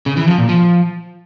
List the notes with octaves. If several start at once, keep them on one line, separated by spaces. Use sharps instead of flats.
C#3
E3
F3
A#2
F3